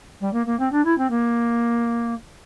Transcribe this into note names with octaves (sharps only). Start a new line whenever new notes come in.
G3
A#3
A#3
C4
D4
E4
C4
A#3